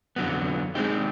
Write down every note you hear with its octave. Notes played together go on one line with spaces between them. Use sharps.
F2 D3 F#3 B3
G#3 C4 D#4 G4